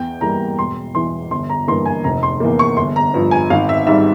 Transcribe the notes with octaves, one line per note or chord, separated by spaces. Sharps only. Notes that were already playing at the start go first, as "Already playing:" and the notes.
Already playing: E2 G5
E3 G3 A#3 A#5
E1 C6
E2 E3 C6
G1 C6
A#5
G2 E3 A#3 C6
G#5
F1 A#5
C6
E2 E3 A#3
C#6
G1 C6
A#5
G2 F3
G#5
G#1 F5
E5
G#2 G3 E5